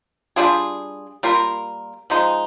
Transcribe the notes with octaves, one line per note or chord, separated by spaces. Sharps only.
G3 D4 F4 G#4
G3 A#3 F4 A#4
F3 G#3 D#4